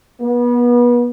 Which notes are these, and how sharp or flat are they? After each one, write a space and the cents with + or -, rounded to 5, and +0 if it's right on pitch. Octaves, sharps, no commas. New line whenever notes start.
B3 -30